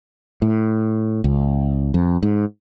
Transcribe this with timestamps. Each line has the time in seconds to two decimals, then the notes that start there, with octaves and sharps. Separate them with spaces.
0.42 A2
1.24 C#2
1.94 F2
2.23 G#2